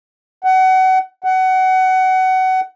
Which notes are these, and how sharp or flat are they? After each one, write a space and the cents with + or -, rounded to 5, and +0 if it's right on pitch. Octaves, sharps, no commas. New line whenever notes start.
F#5 +25
F#5 +20